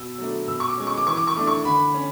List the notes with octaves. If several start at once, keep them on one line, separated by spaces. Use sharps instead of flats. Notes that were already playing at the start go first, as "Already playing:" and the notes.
Already playing: B2 E6
F#3 A3 D4
B2 E6
C#6
D6
G#3 C#4
C#6
D6
E3 C#6
D6
C#6
A3 D4 D6
C#6
D3 B5
C#4